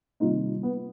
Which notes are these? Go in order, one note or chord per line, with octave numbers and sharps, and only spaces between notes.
C3 D#3 G3 A#3 D#4 F4
B3